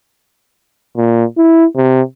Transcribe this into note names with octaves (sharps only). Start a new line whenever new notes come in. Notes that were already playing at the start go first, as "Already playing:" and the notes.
A#2
E4
C3